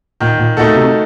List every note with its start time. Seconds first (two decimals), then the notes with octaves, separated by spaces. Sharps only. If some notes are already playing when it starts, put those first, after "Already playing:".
0.20 A#2 D#3
0.39 A#2
0.57 A#2 A3 D#4 F#4 A4
0.75 C3